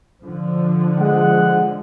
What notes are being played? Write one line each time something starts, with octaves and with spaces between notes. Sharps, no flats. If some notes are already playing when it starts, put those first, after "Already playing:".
D3 F3
G#3 F#5